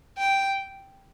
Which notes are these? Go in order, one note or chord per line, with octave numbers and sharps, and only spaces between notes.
G5